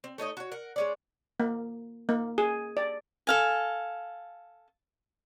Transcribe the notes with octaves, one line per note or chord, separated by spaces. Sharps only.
C4
A3 D#4 C#5 D#5
F#4 C#5
A#4 F#5
G#3 C#4 D5
A#3
A#3
G#4
D5
A4 F5 G#5